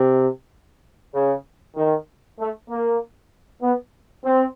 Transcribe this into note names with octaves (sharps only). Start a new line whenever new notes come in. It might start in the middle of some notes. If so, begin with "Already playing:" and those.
Already playing: C3
C#3
D#3
A3
A#3
B3
C4